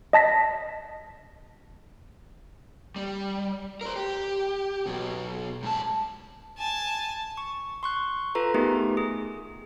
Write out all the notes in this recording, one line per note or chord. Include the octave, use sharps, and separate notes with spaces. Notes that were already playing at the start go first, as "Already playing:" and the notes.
D#5 A5 A#6 B6
G3
A#4 C5
G4
B2 F#3
G#2 A5
G#5 A5
C#6
C6 C#6 F#6
F4 A4 B4 A#5
A3 B3 D#4 G4 G#4 A#4
G#4